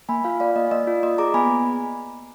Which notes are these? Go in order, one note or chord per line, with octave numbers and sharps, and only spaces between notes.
A#3 G#5 B5
F4 F5 G#5
A#3 D5 F5
D5
A#3 D#5
A#3 D#5
F4 D5
A#3 D#5
G#4 A#5 D6
B3 G#5 B5